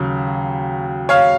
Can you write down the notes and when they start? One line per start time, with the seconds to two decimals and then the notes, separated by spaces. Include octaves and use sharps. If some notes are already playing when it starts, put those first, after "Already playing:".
Already playing: D#2 C#3 F#3
1.09 C#5 F5